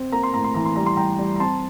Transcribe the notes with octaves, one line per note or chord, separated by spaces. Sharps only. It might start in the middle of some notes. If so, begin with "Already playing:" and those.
Already playing: C4
A#3 A#5
C6
A2 A#5
C6
E3 A#5
C6
G3 A#5
C6
G3 G5 A#5
G3
A#5
C4 A5 C6